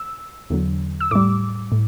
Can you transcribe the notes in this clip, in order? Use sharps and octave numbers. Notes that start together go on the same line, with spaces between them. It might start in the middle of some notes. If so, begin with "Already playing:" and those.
Already playing: E6
E2 D3 F#3
E6
A2 G3 D6
A2